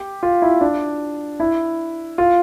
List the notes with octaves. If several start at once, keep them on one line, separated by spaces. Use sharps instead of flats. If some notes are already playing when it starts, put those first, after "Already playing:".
Already playing: G4
F4
E4
D4
E4
F4